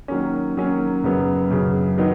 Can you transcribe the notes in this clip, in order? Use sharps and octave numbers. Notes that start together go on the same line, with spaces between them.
D#3 F#3 A#3 C#4
D#3 F#3 A#3 C#4
F#2 C#3 F#3 B3
F#2 C#3 F#3 B3
D#3 F#3 B3 D#4